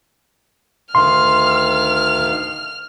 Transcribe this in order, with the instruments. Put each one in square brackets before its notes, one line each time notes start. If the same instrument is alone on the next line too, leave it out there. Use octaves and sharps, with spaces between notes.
[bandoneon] D2 D#3 F5 [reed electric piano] C6 [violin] F6